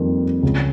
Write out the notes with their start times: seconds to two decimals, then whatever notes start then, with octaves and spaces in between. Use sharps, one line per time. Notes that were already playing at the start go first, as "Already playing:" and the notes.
Already playing: F2 D#3 G3 A#3
0.43 C#2 C#3 G#3